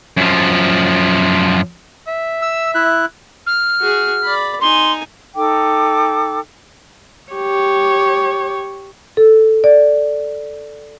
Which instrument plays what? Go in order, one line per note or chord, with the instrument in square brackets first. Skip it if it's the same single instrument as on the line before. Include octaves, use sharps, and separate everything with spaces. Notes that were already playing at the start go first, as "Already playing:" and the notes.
[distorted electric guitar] F#2 F3
[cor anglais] E5
[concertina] E6
E4 F#6
[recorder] F6
[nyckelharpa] F#4 G#4
D5 B5
[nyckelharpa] D#4 G#5 [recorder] C6
[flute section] D#4 A4 G5 D6
[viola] G4 C#5
[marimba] A4
D5